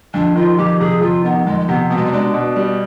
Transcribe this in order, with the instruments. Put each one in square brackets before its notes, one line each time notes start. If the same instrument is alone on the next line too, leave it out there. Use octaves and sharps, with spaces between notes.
[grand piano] F2 [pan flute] D4
[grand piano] D#3 [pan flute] F4
[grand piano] F2 [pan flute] G4
[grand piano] C3 [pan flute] G#4
[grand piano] F2 [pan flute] F4
[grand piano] D#3 [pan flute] B3
[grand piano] F2 [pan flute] G#3
[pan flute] G#3
[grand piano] C3 [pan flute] B3
[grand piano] B2 [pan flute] B3
[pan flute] G#3
G3
[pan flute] G#3 [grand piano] D4
[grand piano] B2
G3